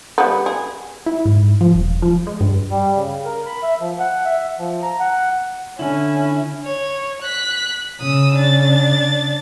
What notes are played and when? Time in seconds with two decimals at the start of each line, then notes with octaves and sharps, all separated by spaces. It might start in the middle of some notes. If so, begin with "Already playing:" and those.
0.18 G3 B3
0.46 G#4
1.06 E4
1.25 G#2
1.61 F3
1.74 E1
2.02 F3
2.27 G#3
2.41 G2
2.71 G3
2.95 C#3
3.25 A#4
3.46 B5
3.63 E5
3.80 F3
3.99 F#5
4.25 E5
4.59 F3
4.83 A#5
5.00 F#5
5.79 D3 C#4 E4
6.63 C#5
7.22 F#6 B6
8.01 C#3 D#6 E6
8.35 D4 A6